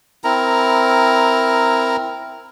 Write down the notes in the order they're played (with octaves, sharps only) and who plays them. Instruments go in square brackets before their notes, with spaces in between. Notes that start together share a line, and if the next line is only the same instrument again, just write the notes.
[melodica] C4 E4 A#4 A#5